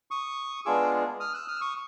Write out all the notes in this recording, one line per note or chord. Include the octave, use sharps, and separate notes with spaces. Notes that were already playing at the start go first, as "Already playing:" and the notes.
C#6 D#6
G#3 B3 D4 F4 G#4 D6 E6
D#6 F6
E6 F#6
D#6 F6
E6
C#6 D#6